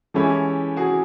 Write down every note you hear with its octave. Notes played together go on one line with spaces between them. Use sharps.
E3 G#3 C#4 E4 G4 A4
F#4 G#4